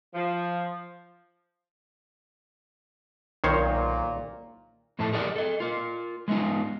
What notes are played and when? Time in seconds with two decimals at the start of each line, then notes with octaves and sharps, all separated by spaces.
0.15 F3
3.44 B1 A#2 D#3 C5 C#5
4.99 F2 A2 E4 A4 A5
5.13 G4 G#4 A#4 D5 D#5 F#5
5.36 A4 D#5
5.60 F4 A#4
6.28 G#3 A3 B3 D#4 F4